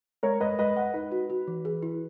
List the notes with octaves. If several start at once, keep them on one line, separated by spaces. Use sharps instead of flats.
G#3 A#4 C#5
G#3 B4 D#5
G#3 B4 D#5
G#3 D#5 F#5
D#4 B4
F#4
F#4
E3
G#4
E4